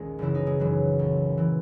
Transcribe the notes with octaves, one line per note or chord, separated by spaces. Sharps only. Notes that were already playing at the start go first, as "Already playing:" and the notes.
Already playing: A#1 D#2 D#3 G#3 C#4
F#1 F#2 C#3 E3 E4
D#4
G#3
F#1 F#2 C#3 E3 F#3
B1 A#2
A#2 E3